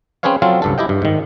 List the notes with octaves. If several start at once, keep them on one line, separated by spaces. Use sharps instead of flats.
C4 C#4 G#4 B4 C#5 F5
F#3 C4 F4 A4 F5
C#2 G2 A4
E4 G4 D#5 G5
G2
G#2 D#3